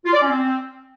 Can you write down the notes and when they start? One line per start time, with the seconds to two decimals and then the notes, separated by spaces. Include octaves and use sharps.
0.05 F4
0.13 D5
0.21 C#4
0.29 C4